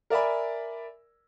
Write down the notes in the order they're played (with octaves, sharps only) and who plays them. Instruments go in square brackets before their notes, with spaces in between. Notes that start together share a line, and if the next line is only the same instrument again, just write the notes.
[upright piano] A#4 D5 E5 G#5 B5